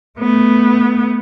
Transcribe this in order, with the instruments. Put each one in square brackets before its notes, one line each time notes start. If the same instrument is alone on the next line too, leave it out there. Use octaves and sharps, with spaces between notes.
[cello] A3 B3